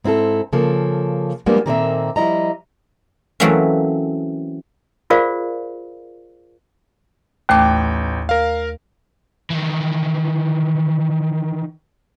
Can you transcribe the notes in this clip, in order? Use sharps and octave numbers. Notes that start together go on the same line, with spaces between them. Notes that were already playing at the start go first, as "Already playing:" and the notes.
G#2 C4 E4 G#4 A4
C#3 F3 A#3 A4
F3 G3 G#3 A#3 B3 D4
A#2 D#3 A#3 C4 A4 E5
F3 G3 E4 D#5 A#5
E3 F#3 A3 A#3 C4 C#4
F4 G#4 A#4 C5 D5 F5
A1 D#2 A3 G5 D6
A#4 F5
D#3 E3